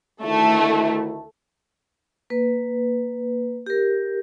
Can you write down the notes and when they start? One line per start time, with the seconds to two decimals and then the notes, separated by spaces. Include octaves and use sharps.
0.23 D2 D#3 A3 E4
2.30 A#3 B4
3.66 G4 A#4